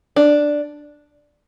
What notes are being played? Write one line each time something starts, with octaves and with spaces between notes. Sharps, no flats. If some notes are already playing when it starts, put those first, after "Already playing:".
D4